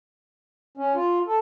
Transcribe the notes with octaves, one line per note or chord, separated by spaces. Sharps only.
C#4
F4
A4